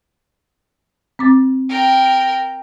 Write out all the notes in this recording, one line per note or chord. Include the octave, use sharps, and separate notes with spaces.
C4 D6 A6
A#4 G5